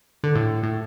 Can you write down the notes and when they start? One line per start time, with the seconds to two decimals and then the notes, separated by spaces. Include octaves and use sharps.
0.24 D3
0.35 A2
0.63 A2